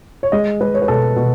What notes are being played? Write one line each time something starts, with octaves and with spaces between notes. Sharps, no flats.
C#5
G#3 D#5
G#3 B4
C#5
B4
B2 A4
B2